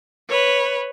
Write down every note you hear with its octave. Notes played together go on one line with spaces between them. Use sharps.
B4 C#5